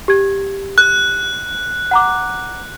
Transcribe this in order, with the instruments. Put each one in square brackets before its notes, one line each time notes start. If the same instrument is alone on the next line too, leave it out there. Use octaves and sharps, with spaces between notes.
[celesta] G4 G#6
[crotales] F#6
[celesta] F#5 A#5 D6